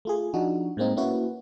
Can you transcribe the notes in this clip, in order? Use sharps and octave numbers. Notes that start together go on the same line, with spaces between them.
A3 F4 G#4
F3 D4 D#4 F#4
A2 G#3 A#3 C4 D#4
A#3 C#4 E4 F#4 B4